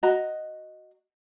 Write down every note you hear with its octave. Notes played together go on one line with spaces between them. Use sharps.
F#4 D#5 A#5